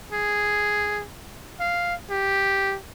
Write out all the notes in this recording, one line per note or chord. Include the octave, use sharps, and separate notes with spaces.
G#4
F5
G4